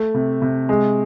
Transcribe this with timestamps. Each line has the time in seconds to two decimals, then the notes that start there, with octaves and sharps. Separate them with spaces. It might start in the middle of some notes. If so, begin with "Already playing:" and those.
Already playing: A3
0.14 C3
0.42 C3
0.69 G#3